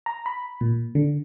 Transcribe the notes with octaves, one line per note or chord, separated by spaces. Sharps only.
A#5
B5
A#2
D3